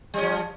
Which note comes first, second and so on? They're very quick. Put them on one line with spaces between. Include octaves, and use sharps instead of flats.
G3 C#4 F3